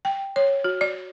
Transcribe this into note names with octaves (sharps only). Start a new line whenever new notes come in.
G5
C#5
F#4
D5